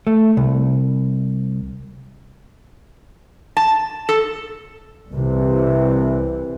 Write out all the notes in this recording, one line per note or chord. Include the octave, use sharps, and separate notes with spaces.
A3
C2
A5
A4
C2 C3 E3